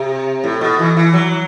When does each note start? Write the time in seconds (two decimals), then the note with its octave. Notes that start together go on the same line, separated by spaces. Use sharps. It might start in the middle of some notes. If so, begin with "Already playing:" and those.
Already playing: C3
0.44 A2
0.61 B2
0.79 E3
0.97 E3
1.14 F#3